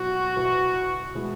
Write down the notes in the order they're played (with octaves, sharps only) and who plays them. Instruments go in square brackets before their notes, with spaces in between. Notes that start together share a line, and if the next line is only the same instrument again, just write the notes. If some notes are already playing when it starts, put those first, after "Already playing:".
Already playing: [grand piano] B2 F#3 E4 [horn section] F#4
[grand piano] B2 B3 E4
B2 G#3 B3 E4